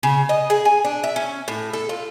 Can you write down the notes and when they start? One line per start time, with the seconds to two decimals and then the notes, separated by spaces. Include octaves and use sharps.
0.03 C#3
0.29 D#5
0.50 G#4
0.65 G#5
0.85 D4
1.04 E5
1.16 C#4
1.48 A2
1.73 A4
1.89 F4